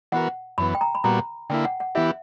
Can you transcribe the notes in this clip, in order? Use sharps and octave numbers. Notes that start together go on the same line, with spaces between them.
E3 B3 F#4 A#4 F#5
F#2 E3 B3 B5
G5
A#5
B5
A#2 G3 B3 F#4 A#5
D3 A#3 E4 G5
F#5
F#5
E3 B3 E4 G4 E5